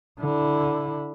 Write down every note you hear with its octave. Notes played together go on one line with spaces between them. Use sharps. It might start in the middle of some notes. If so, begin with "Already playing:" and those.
D3 E4